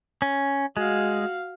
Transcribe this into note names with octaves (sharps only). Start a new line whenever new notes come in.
C#4
G#3 F#4 F5